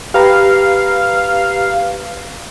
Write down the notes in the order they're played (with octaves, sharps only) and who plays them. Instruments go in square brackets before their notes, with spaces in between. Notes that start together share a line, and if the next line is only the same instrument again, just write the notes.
[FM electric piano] G4 B4 A#5 [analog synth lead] F5